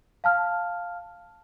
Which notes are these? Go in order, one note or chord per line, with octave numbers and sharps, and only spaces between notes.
F5 A5 F6